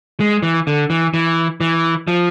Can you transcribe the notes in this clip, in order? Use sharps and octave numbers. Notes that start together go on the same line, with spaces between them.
G#3
E3
D3
E3
E3
E3
F3